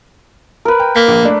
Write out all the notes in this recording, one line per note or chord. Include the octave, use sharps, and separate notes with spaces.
A#4 B4
G5
A#3 B6
A#1
A3 D4